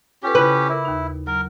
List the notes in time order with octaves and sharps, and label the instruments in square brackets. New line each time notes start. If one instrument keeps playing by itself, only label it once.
[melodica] C#4 G4 [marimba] F4 A4 B4
[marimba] C#3 E4 [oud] B4
[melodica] E4 [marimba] A#4 D6
[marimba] D#2 D#4
[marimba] F#3 [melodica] A#4